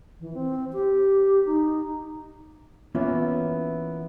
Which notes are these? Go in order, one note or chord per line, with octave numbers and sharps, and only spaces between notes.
E3
C4
G4
D#4
E3 A#3 B3 C#4 E4 F4